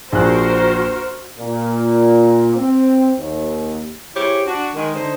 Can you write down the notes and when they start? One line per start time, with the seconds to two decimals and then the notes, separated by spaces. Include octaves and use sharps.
0.13 A#1 F#4 A#4 C5 F#6
1.38 A#2
2.55 C4
3.18 D#2
4.16 E4 G4 G#4 C5 C#5
4.47 D4 F#4
4.75 D#3 G#3
4.95 D3 D#4 C5